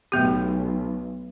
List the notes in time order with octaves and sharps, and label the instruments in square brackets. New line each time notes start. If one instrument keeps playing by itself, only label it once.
[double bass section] B1 [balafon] A3 B3 G4